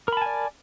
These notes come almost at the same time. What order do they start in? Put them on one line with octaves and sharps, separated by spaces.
A#4 B5 A5 G#5 D5